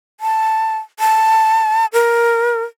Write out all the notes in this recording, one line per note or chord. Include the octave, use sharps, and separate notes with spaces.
A5
A5
A#4